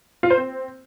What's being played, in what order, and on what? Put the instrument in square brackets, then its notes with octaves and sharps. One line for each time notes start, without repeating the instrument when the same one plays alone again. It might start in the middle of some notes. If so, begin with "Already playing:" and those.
[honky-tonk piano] F4
C5
C4